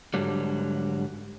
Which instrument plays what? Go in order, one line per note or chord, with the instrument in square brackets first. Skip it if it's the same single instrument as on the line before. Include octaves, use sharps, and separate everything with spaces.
[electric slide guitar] G#2 D3 F#3 G3